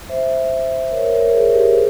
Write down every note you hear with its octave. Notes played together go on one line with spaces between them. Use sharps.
C5 E5
A#4 C#5
A#4 C#5
G#4 C5
G4 A#4
G#4 C5